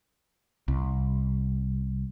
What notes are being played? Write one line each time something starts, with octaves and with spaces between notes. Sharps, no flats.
C2